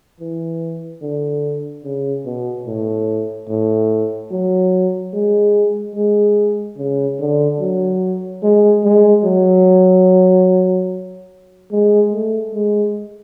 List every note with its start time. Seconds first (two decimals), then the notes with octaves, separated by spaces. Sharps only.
0.20 E3
1.02 D3
1.84 C#3
2.26 B2
2.67 A2
3.49 A2
4.31 F#3
5.13 G#3
5.95 G#3
6.78 C#3
7.19 D3
7.60 F#3
8.43 G#3
8.84 G#3
9.24 F#3
11.71 G#3
12.13 A3
12.54 G#3